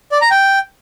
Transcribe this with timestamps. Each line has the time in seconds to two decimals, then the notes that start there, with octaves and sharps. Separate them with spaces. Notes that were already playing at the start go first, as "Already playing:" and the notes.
0.12 D5
0.21 A#5
0.31 G5